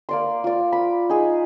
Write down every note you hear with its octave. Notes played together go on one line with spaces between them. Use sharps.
A#3 D5 C6
F4 D5
B5
D#4 G#4